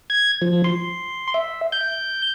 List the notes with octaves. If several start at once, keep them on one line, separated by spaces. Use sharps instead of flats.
G#6
F3
C6
E5
G6